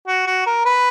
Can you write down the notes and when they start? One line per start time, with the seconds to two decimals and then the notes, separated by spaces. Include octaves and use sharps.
0.07 F#4
0.27 F#4
0.46 A#4
0.65 B4